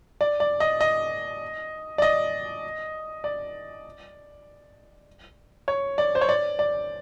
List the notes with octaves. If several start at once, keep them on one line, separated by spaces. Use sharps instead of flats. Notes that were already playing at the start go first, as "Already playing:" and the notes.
D5
D5
D#5
D#5
D5
D#5
D5
C#5
D5
C5
C#5
D5
D5